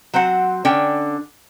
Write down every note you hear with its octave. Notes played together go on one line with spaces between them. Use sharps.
F#3 C4 C5 F#5
D3 C#4 D4 G5